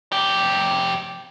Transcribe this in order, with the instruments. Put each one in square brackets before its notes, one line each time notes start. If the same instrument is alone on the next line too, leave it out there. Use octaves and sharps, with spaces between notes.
[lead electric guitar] F2 G4